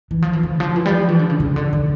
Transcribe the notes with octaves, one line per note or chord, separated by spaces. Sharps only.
E3
F3
E3
D3
F3
E3
G3
F3
E3
D3
C#3
C#3
D3
D3